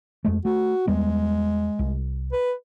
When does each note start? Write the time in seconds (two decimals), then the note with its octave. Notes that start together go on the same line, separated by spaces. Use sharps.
0.25 F2 G#3 A3
0.45 A3 F#4
0.87 E2 G3 G#3 B3
1.79 C2
2.32 B4